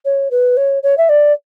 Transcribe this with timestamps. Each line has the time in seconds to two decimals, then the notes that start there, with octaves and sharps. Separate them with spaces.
0.05 C#5
0.31 B4
0.57 C#5
0.83 C#5
0.97 E5
1.09 D5